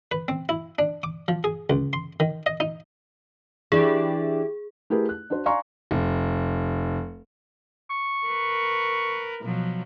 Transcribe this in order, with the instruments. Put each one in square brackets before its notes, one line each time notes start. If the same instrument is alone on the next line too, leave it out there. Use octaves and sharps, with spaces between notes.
[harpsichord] B4
C4
E4
D4
D6
F3
G#4
C#2
C6
D#3
D#5
D#4
[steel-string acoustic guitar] E3 D4 D5 [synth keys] E4 G4 [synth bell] G#4
[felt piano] A3 E4 G4 G#4 A#4 B4
F#6
D4 F#4 C5
D5 F5 G#5 A#5 C6 C#6
[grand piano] F1
[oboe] C#6
[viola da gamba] A#4 B4
B2 F3 F#3